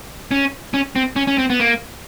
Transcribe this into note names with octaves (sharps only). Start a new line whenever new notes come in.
C#4
C#4
C4
C#4
C#4
C4
B3
A#3